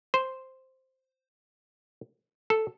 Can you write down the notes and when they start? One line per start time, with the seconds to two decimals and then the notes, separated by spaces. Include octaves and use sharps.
0.14 C5
2.50 A4